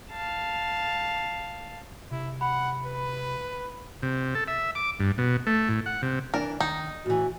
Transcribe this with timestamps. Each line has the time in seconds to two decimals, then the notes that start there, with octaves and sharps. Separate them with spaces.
0.11 F5 A5
2.11 C3 E4
2.41 F#5 B5
2.86 B4
4.03 C3
4.35 A4
4.48 E5
4.75 D6
5.00 G2
5.18 B2
5.47 A3
5.69 A2
5.86 F#5
6.02 C3
6.34 E3 D4 A#4 D5
6.60 D#3 D#4
7.06 A2 E3 F#4